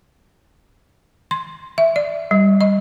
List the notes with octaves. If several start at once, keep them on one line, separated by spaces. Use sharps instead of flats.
C6
E5
D5
G3
D#5